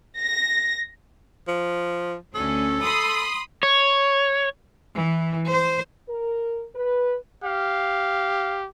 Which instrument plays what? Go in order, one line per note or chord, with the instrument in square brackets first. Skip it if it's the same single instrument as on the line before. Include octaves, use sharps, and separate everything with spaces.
[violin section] A#6
[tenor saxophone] F3
[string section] D2 C#4 [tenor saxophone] A4
[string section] B5 C6 D#6
[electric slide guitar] C#5
[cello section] E3
C5
[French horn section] A#4
B4
[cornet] G4 [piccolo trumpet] F5